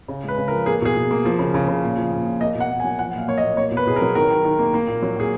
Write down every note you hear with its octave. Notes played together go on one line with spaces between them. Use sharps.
C#3
G#3 B4
C#3
A#4
F3
A#3 G#4
B2 G#4
B2
A#3
F3
C#3
C#3
C#3
A#2
F3
A#2
A#2
A#3 D#5
B2
F#5
A#3
G#5
F#3
F3 F#5
A#2 F5
A#3 C#5
D#5
A#2
A#3 C#5
B2
B4
B2 G#4
A#4
F#3
D#3 A#4
D#3
D#3
A#3
A#3
A#2
F#3
A#2 G#4